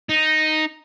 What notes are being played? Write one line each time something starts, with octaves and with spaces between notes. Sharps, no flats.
D#4